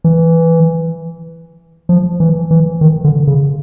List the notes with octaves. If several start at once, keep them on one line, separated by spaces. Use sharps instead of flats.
E3
F3
E3
E3
D#3
D3
C#3